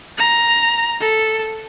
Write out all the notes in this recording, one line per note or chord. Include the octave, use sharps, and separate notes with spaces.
A#5
A4